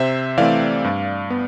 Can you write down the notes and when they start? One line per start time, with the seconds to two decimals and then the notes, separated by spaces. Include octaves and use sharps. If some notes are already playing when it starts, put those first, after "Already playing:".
Already playing: C3 C5 E5
0.38 E3 A3 C4 D5 F5
0.84 G2
1.30 B3